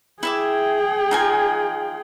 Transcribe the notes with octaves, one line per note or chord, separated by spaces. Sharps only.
E4 G#4 E5 G5 D6
D#4 F4 G#5